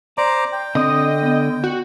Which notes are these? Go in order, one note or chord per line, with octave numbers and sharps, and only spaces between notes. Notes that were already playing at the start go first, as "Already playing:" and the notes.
C5 D5 A#5 D6
G5
D3 C4 D#5 D#6
B3
F#4